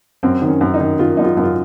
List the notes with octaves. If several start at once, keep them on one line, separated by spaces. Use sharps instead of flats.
F#2 C4
D#3
C#4
F#2
D#4
D#3
D#3 F4
F#2 D#4
F4
F#2
F4